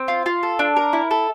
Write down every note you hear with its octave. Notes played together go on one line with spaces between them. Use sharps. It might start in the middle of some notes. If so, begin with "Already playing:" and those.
Already playing: C4
F4
F4
A4
D4
A#4
E4
A4